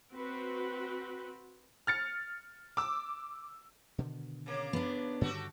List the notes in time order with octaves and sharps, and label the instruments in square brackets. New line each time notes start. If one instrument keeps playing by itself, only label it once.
[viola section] C4 F#4 B4
[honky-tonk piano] F6 A6 C#7
D6 E6
[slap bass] B2 D3 D#3
[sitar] C#3 A#3
[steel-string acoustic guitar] B3 D4
[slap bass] G2 D3 D#3 [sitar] A3 F#4 G4